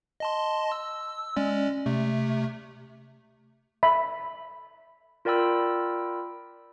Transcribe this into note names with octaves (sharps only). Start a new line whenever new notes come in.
D#5 A5 C6
E6
G#3 C#4 D5
C3 A3
E5 B5
F4 A#4 D5 G5 B5 E6